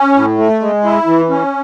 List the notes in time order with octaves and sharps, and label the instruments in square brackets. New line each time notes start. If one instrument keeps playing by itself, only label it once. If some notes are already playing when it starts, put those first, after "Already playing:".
Already playing: [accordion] C#4
A2
A3
G#3
E4
E3
C#4